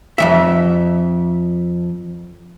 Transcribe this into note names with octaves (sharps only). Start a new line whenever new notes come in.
F2 D#3 E5